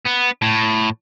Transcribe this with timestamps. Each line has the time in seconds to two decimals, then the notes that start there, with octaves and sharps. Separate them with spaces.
0.06 B3
0.42 A2